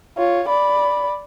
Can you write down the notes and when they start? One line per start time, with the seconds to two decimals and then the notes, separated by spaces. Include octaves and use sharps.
0.18 F4 C#5
0.48 D5 B5